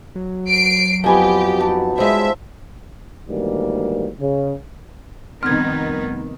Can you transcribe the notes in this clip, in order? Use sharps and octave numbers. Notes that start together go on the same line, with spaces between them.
F#3
C7 D7
F2 B3 G4 B4 G#5 A5
D#4 F#5 A5
G3 G#3 F4 C5 E5
D2 G#2 D#3 E3 G3 A#3
C#3
F1 D#3 G3 B3 C4 D#4 F6 G#6